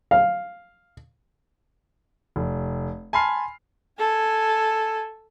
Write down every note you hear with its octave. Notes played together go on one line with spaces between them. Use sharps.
F5
F1
G#5 A5 B5 C6 F6 C7
A4 G#5